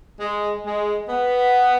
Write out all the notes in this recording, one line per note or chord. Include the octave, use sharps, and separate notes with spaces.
G#3
G#3
B3